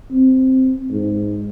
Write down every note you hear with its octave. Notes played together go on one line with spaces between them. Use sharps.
C4
G#2